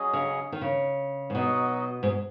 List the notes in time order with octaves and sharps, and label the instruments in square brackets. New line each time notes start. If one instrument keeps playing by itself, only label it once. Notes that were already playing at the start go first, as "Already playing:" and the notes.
Already playing: [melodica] F#3 C#4 G#4 D#5
[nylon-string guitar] C#3
D#3
C#3
G#2
[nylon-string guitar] B2 [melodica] F#3 D#4 F#4 D#5
[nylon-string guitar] G#2